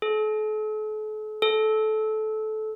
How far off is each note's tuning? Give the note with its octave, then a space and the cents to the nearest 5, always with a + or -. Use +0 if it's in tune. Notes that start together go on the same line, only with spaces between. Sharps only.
A4 -40
A4 -20